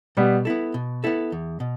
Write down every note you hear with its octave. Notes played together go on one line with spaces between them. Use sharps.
B2 G3 B3
B3 E4 A4
B2
B3 E4 A4
E2
B2